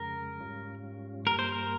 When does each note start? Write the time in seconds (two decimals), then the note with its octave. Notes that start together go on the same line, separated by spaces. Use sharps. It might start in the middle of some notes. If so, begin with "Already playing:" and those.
Already playing: F2 C#3 G#3 A#4
0.40 G#2 G3 C#4 F4
1.24 G2 G3 A#3 A#4
1.39 C5
1.52 A#4